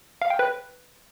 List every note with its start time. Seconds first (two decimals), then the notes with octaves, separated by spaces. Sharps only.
0.22 F5
0.30 G5
0.39 B4